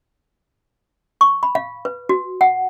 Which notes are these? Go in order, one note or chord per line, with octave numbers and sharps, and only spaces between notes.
C#6
B5
F5
B4
F#4
F#5